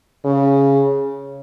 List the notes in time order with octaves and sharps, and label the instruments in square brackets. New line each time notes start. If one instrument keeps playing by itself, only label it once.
[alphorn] C#3